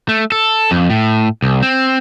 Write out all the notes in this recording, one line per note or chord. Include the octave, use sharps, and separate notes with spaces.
A3
A4
F2
A2
C2
C4